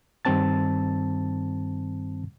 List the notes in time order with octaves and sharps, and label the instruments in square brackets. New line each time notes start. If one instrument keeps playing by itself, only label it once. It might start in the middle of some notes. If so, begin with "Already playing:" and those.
[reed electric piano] G2 D#3 G3 C4 A5 A6